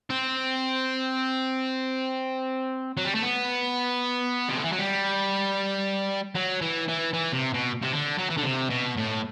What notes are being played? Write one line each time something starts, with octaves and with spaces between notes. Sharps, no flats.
C4
F#3
G3
A3
B3
C3
D3
E3
F#3
G3
F#3
E3
E3
E3
C3
B2
C3
D3
F#3
E3
D3
C3
B2
A2